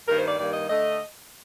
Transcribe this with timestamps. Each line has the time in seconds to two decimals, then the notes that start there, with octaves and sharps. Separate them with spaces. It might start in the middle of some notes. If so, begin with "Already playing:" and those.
0.08 G2 D#3 A#3 A#4
0.18 C5
0.28 D5
0.38 G2 D#3 G3 A#3 D5
0.53 D#5
0.68 D3 A3 D4 D#5